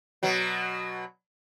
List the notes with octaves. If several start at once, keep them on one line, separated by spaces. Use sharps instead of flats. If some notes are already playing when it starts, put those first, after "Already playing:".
B2 F#3